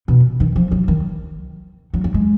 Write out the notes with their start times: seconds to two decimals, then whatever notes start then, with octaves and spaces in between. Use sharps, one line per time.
0.08 B2
0.40 D#3
0.56 F3
0.72 F#3
0.88 D#3
1.94 F#3
2.04 F#3
2.14 G#3